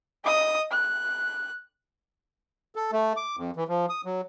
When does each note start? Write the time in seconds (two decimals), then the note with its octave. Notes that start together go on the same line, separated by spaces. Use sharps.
0.24 D#5 D#6
0.71 F#6
2.76 A4
2.92 A3
3.17 D6
3.37 F2
3.56 E3
3.68 F3
3.89 D#6
4.05 F#3